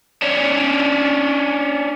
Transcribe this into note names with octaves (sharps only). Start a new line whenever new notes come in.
C#4 D4